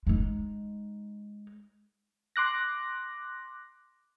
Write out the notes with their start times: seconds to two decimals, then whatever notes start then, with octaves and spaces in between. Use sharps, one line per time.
0.07 G#3 D#4
2.36 C6 D6 F#6 A#6